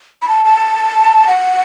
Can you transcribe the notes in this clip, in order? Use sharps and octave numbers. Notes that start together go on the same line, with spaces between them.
B5
A5
A5
F#5